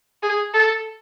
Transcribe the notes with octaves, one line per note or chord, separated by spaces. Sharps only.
G#4
A4